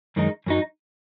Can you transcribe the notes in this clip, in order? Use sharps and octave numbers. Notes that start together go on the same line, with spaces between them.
F#2 D#3 G#3 D#4
F#2 F#3 D#4